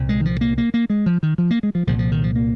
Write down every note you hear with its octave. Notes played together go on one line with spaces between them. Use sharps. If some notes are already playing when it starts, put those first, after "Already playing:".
Already playing: C2 A#2
G#3
D#3
F3
A#3
A#3
A#3
G#3
F3
D#3
F3
A#3
G#3
F3
C2 A#2 F3
F3
D#3
F3
A#3